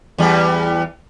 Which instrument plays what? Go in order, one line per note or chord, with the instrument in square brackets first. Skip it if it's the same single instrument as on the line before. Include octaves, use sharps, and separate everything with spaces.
[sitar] E2 G3